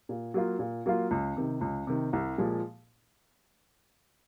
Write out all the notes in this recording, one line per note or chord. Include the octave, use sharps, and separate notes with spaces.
A#2
F#3 A#3 F4
A#2
F#3 A#3 F4
C#2
C3 D#3
C#2
C3 D#3
C2
A#2 F3 G#3